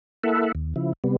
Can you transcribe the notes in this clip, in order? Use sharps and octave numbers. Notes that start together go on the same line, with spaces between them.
A#3 E4 A4 E5 F#5
D#2
C#3 F3 E4
C3 G3 B3